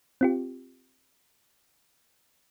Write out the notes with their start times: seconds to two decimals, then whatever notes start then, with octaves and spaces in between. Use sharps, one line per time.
0.21 C4 F4 G4